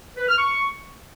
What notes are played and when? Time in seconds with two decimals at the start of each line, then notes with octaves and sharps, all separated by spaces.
0.17 B4
0.28 F6
0.39 C#6